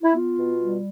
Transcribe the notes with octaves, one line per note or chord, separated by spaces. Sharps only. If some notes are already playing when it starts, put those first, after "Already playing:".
E4
B3 F4
B2
G3